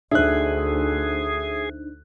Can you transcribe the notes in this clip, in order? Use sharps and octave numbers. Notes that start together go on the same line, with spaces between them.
D2 D4 D#4 G#4 C5 E5 F#6